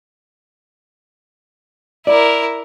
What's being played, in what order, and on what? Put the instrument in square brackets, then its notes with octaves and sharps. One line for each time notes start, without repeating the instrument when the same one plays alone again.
[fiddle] E4 A#4 [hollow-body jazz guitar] D5